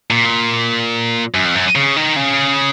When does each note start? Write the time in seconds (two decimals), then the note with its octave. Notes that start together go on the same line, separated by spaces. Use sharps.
0.11 A#2
1.34 F#2
1.45 F2
1.55 F#2
1.75 C#3
1.96 D#3
2.16 C#3